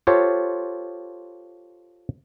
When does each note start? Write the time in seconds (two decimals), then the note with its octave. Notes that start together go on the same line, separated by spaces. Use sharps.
0.07 F4 G4 A4 C5 C#5